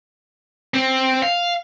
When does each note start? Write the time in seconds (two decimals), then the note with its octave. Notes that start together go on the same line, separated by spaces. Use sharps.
0.74 C4
1.23 F5